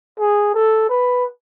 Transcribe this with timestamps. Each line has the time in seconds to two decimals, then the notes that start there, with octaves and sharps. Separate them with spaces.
0.19 G#4
0.54 A4
0.89 B4